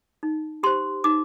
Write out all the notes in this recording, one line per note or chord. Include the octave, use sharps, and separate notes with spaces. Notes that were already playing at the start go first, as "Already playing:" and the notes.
D#4
G4 C5 C6
D#4 D6